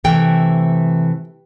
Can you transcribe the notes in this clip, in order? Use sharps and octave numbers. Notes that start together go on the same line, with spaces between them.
C3 E3 A3 G5